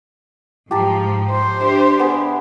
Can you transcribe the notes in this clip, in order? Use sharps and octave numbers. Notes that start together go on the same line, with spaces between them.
G#2 F3 G4 A5 A#5
C5
D4 G4 E5
B3 G#4 B4